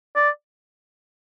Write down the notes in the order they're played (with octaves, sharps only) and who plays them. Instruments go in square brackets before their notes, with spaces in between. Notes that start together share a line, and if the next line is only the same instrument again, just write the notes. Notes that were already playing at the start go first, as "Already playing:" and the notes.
[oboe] D5